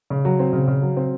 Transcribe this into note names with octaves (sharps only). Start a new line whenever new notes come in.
C#3
F#3
C4
C#3
C#3
F#3
C4